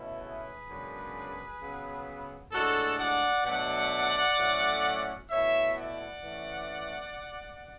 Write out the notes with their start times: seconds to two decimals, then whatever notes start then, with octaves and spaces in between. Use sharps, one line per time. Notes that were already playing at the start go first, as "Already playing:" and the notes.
Already playing: B2 A3 C#4 E4
0.21 G#4 B4
0.67 F#2 C#3 G#3 B3 D4
1.59 C#3 F#3 B3
2.52 A2 G#3 D4 F#4 A4
2.99 D5 F#5
3.45 B2 F#3 A3 D4 D5 F#5
4.38 A2 F#3 A3 C#4
5.30 B2 A3 E4 C#5 E5
5.77 D5 F#5
6.23 E3 A3 C#4